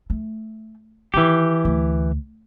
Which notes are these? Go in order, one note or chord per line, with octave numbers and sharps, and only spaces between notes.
A3
D#3 E3 G4
D2